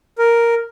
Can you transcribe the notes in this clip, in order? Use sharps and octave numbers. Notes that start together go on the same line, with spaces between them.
A#4